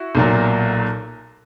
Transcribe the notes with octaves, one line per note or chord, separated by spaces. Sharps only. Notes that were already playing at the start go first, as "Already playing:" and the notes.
Already playing: E4 F#4
B1 A#2 F#3